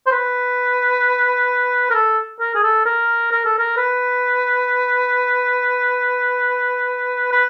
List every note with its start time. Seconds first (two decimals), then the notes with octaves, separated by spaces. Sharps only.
0.06 C5
0.12 B4
1.90 A#4
1.95 A4
2.40 A#4
2.55 G#4
2.63 A4
2.86 A#4
3.31 A#4
3.45 A4
3.59 A#4
3.77 B4
7.32 B4